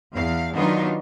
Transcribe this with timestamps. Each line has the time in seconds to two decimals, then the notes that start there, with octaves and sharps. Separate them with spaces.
0.12 E2 F5
0.56 D#3 F#3 B3 D4 D#4 F4